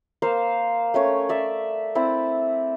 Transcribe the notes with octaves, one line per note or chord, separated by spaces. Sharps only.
A#3 C5 F5 E6
A3 C#4 C#5
D5 E5
C4 E4 D5